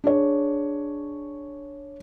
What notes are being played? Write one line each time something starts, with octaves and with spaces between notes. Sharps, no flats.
D4 G#4 C#5